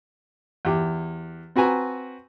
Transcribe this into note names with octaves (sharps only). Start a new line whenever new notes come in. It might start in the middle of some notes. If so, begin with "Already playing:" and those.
E2 G4
C4 F#4 B4 G#5 A#5